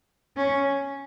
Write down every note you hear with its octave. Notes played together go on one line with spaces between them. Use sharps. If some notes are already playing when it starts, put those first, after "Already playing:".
C#4